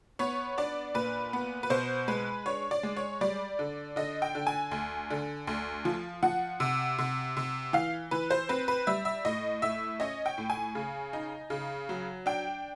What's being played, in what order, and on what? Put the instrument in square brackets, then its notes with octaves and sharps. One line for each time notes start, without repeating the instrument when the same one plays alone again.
[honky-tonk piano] B3 C#5
D4 D5
A#2 B4
B3
B4
B2 C5
G#3 B4
D4 C#5
D5
G#3
C#5
G3 D5
D3
D3 D#5
G5
D3
G#5
D2
D3
D2
F3
F3 F#5
C3
C3
C3
E3 F5
E3 B4
C5
C4 B4
B4
G3 E5
E5
A2 D#5
A2 E5
C#4 D#5
G5
A2
G#5
C#3
D#4
C#3
F#3
D4 G5